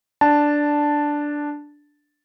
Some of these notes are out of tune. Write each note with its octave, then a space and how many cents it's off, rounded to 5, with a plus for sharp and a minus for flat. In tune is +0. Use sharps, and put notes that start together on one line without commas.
D4 +0 A5 +0